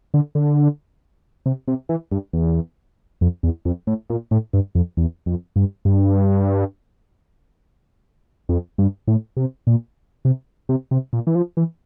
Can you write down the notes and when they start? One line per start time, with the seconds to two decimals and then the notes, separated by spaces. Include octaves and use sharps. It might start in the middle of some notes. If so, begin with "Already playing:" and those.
0.14 D3
0.35 D3
1.46 C3
1.68 C3
1.89 E3
2.11 G2
2.33 E2
3.21 F2
3.43 E2
3.65 F2
3.87 A2
4.10 A#2
4.31 A2
4.53 G2
4.75 F2
4.97 E2
5.26 F2
5.56 G2
5.85 G2
8.49 F2
8.78 G2
9.08 A2
9.37 C3
9.67 A#2
10.25 C3
10.69 C3
10.91 C3
11.13 A#2
11.27 E3
11.35 F3
11.57 E3